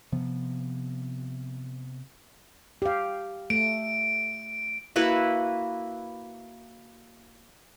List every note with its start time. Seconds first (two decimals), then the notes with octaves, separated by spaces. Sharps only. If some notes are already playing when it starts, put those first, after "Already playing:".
0.12 C3 F3 B3
2.82 G4 F5
3.50 A3 D7
4.96 A#3 E4 F#4 B4